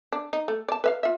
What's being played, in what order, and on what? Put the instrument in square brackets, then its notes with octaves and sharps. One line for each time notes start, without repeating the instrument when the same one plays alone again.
[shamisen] D4
D#4
A3
D5 A5
B4 E5 F5
F4 E5